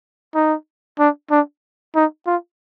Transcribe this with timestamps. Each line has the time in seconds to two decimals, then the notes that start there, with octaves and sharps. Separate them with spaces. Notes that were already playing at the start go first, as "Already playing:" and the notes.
0.35 D#4
0.99 D4
1.31 D4
1.95 D#4
2.26 F4